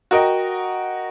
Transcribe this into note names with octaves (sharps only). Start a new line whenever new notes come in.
F#4 A#4 D#5 G5